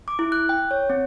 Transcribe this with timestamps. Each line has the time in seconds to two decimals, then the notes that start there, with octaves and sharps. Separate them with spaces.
0.08 D6
0.19 E4
0.32 F#6
0.49 G5
0.71 C#5
0.90 C4